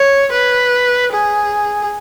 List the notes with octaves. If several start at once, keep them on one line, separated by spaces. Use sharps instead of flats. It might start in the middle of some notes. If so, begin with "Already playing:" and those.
Already playing: C#5
B4
G#4